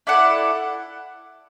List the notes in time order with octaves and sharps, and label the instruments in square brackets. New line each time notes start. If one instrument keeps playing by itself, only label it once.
[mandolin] E4 A4 D5 F#5